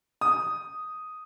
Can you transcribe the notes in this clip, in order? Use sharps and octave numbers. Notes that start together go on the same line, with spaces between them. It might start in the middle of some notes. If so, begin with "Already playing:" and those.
D#6